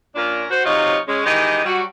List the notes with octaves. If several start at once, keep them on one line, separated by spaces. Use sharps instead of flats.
A#2 C#4 D4 F4 A#4
F#4 C5
C3 F#3 D#4 F4 C#5 D#5
G#3 C#4
D#3 E3 G#3 G4 D#5
F#3 G3 F#4